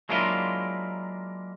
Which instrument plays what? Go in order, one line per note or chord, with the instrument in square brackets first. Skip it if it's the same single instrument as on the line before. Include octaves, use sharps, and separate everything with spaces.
[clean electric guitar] F#3 G#3 A#3 D4 E4 F4